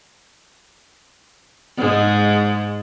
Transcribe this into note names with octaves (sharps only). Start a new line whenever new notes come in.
G#2 G#3